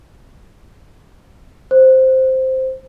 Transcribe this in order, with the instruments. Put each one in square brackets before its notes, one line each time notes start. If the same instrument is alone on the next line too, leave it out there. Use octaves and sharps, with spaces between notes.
[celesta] C5